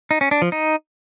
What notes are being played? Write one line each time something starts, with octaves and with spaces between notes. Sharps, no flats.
D#4
C#4
D4
F3
D#4